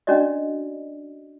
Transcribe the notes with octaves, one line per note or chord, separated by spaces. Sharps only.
C#4 D4 F#4 D5 D#5